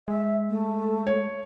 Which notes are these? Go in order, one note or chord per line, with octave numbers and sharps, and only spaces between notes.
G#3 E5
A3
C#5